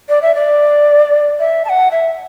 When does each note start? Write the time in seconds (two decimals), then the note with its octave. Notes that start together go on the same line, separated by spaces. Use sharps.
0.09 D5
0.22 E5
0.35 D5
1.39 E5
1.65 A5
1.69 F#5
1.91 E5